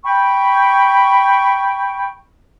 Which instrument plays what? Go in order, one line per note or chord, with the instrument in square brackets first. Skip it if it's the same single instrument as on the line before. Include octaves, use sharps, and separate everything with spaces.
[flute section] G5 B5 C#6